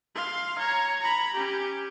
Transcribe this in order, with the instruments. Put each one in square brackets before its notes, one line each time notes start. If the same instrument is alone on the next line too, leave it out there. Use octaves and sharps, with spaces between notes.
[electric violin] F5 C6
C#5 A#5
A#5 B5
C#4 G4